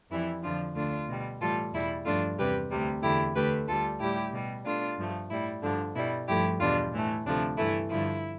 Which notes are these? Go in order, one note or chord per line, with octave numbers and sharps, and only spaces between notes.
F2 E3 G3 E4
F2 D3 F3 D4 F4
D2 D3 A3 D4 F4
B2 G3
A2 E3 G3 F4 A4
E2 B2 G3 E4
G2 F3 A3 D4 F4
E2 C3 G3 G4 B4
D2 C3 G3
E2 D3 A3 E4 G4
D2 D3 A3 G4 B4
D2 D3 G3 F4 A4
A2 G3 E4 G4
B2 G3
B2 A3 D4 F4
G2 F3 A3
A2 G3 E4
G2 D3 F3 D4
B2 G3 E4
G2 F3 A3 E4 G4
E2 B2 G3 D4 F4
A2 E3 A3
D2 C3 F3 A3 D4
G2 E3 A3 E4
G2 D3 F3 A3 E4